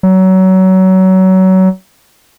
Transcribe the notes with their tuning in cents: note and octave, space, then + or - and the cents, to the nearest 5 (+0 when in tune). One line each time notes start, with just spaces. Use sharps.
F#3 +25